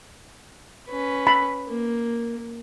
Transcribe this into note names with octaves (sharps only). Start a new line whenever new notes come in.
C#4 B4
B5
A#3